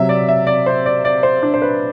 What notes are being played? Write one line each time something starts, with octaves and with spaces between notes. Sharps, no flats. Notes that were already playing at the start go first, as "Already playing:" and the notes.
Already playing: C3 F#3 E5
D5
E5
D5
C5
D5
D5
C5
D4
C5
B4